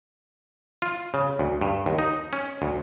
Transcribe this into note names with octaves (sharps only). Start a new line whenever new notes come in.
F4
C#3
D2
G2
D#2
D#4
C#4
D2